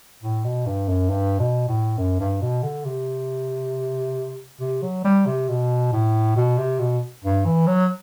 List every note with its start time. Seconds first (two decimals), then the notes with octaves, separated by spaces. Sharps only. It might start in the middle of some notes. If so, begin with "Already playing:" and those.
0.23 A2
0.44 B2
0.66 G2
0.89 F#2
1.10 G2
1.39 B2
1.69 A2
1.98 F#2
2.20 G2
2.42 B2
2.63 D3
2.85 C3
4.60 C3
4.82 F#3
5.04 G3
5.26 C3
5.49 B2
5.92 A2
6.36 B2
6.58 C3
6.79 B2
7.24 G2
7.46 E3
7.67 F#3